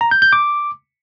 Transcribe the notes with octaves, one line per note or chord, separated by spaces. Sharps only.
A#5
G6
G6
D6